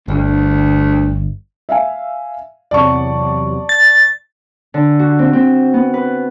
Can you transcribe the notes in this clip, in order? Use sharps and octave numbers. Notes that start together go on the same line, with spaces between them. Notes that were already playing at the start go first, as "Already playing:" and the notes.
G1 D2
E5 F5 G#5
E2 C3 F#3 D5 A5 C#6
A6
D3
F#4
C4
C4
B3
B4